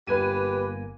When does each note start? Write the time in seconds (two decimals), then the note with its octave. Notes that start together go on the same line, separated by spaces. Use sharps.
0.07 G1 A#3 G4 B4 G#5 D#7